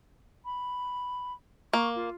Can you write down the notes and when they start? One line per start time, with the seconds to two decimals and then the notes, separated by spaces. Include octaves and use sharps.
0.45 B5
1.73 A#3 C#6
1.96 F4